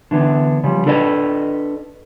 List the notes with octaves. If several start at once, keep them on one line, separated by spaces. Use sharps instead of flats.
D3 E3 B3 D4
C#3 F3 G3
D4 A4 B4 D5 D#5